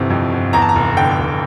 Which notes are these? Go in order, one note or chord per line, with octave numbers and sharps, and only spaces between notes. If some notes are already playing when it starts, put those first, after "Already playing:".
Already playing: G1 C3 E3
F2
G1
E2 A#5
A5
A#5
F1
D3 G5
F1